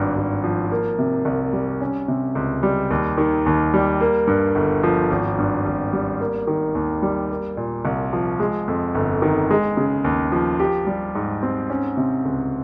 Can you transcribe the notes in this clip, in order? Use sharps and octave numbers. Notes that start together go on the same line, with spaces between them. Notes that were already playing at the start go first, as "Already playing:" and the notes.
Already playing: G#1 G2
G#1
F3
A#3
C3
C2
G3
C#4
C3
C#2
G3
D#2
D#3
D#2
G3
A#3
G2
G1
F3
G#1
G2
G#1
G3
A#3
D#3
D#2
G3
A#3
A#2
C2
F3
G#3
F2
G1
D#3
G#3
C#3
D#2
F3
G4
G3
G#2
C4
C#4
C3
C#2